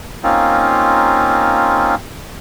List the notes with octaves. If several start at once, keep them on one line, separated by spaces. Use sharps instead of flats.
A#3 C4 C#4 D#4 F4